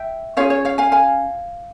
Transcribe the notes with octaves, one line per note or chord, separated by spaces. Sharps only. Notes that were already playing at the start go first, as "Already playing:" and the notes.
Already playing: E5 G5
C#4 F4 G#4 C#5 F5
C#5
C#5 F5
F5 G#5
F5 G#5